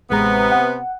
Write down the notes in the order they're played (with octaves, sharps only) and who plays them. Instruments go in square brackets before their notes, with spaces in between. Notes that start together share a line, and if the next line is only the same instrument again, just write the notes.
[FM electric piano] A1 G#3 A#5 [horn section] C3 B3
[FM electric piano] F#5